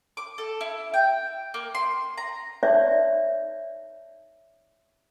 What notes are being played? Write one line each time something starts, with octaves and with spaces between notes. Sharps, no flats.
D6
A4
E4
G5
A#3
C6
A#5
D#4 C#5 D5 E5